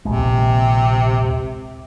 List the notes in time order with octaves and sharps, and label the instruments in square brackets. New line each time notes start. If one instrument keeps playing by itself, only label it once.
[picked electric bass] D#1 A#1 G#3 [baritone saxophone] C3